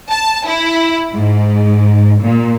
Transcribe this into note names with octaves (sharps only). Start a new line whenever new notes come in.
A5
E4
G#2
A#2